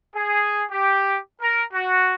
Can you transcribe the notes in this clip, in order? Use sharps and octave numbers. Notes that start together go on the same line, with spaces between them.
G#4
G4
A#4
F#4